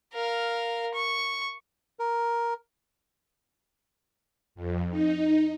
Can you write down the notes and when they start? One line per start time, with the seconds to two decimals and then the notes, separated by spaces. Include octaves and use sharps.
0.13 A#4 F5
0.94 C#6
1.99 A#4
4.55 F2
4.91 D#4